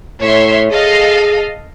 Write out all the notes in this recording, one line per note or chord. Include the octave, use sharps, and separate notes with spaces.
A2 C#5 E5 C6
G#4 A4 D#5 F5